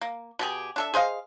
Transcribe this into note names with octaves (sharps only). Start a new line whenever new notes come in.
A#3
B2 G4 G#4
D4 A4 E5
G#4 C5 D#5 F5